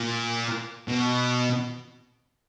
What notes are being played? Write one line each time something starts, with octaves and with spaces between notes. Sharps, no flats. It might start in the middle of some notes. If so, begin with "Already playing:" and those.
Already playing: A#2
B2